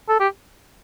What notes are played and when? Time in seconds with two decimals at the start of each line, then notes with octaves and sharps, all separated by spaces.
0.09 A4
0.20 G4